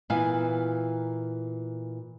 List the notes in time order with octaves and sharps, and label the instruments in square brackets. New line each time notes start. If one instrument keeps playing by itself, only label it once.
[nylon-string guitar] A#2 E3 B3 F5 G#5